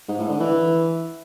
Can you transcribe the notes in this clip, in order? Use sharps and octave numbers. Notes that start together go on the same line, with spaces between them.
G#2
A2
D3
E3